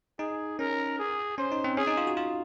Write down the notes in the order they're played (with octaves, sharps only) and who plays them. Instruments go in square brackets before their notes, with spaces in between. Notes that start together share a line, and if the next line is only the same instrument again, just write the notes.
[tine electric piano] D#4 [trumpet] G#4
[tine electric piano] C#4 [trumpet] A#4
[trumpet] G#4
[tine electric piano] C#4 [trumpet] C5
[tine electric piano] D#4
C4
[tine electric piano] C#4 [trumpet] G#4
[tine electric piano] D#4
F4
F#4
F4